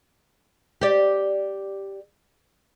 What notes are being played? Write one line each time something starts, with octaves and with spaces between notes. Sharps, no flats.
G4 D5